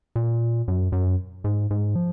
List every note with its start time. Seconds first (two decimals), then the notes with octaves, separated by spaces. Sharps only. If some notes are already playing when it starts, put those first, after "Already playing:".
0.16 A#2
0.68 F#2
0.92 F#2
1.44 G#2
1.71 G#2
1.95 F3